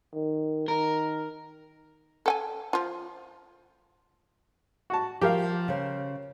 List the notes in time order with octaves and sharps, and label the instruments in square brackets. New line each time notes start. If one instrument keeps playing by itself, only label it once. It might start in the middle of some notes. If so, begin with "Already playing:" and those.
[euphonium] D#3
[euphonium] D#3 [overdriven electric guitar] A#4
[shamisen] A4 G5 G#5
F3 F4
[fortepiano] F#4 A5
[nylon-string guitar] F3 [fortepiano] G4 A#4 F5
[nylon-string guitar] C#3 C5